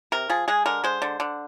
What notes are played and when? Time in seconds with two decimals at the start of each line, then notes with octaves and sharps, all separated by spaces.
0.12 C3 A#4
0.29 F3 G#4
0.48 G#3 G#4
0.66 D3 A#4
0.84 G#3 C5
1.02 D3
1.20 D3